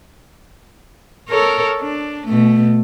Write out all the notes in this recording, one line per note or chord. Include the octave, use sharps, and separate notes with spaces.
A4 A#4 C#5
D4
B2 A3